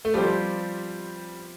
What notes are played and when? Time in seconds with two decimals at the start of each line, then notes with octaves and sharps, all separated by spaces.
0.05 A3
0.14 F3 G3 C4 G4 C5